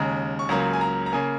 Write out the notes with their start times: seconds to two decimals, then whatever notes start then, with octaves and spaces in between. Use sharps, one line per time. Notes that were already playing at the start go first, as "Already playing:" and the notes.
Already playing: D#2 C#3 G#3 A#5
0.39 C#6
0.49 C#2 C#3 F#3 A#3 A#5
0.73 G#5
0.81 A#5
1.06 A#5
1.13 C#3 A#3 G#5